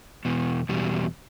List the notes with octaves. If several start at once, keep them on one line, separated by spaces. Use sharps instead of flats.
E2 B2
E2 B2 G3